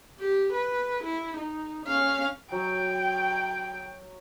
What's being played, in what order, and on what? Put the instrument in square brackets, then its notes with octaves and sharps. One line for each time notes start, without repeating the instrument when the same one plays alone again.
[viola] G4
B4
E4
D#4
C#4 F5
[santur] F#3 [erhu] G5